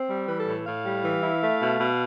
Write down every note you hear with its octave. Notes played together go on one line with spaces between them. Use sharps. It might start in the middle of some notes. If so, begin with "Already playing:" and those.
Already playing: C4
G3
E3 B4
A4
A2
A2 F5
G3
E3
E4
A3
B2
B2